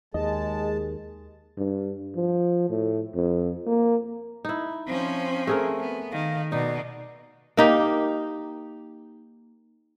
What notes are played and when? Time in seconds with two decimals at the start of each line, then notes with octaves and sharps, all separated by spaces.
0.14 D#2 G#3 G#4 D#5 A5
1.57 G2
2.16 F3
2.70 A2
3.15 F2
3.67 A#3
4.45 D#4 E4
4.87 F3 C4 C#4
5.47 A3 G#4 A#4
5.80 B3
6.11 D#3 F5
6.52 B2 D#4 D5
7.57 A#3 D#4 G4